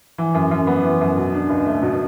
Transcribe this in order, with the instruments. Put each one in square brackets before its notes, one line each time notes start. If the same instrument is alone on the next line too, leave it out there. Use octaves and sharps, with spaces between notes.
[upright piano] E3
F#2
F#2
B3
E3
F#2
B2
D4
C#2
A3
B2